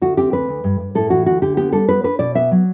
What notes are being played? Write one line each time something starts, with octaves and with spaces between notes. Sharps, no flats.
D2 F#4
C4 G4
D2 B4
D2
G2
G2
A2 A4
E3 F#4
D2 F#4
D3 G4
B3 G4
G3 A4
B3 B4
D4 B4
B2 D5
B3 E5
F#3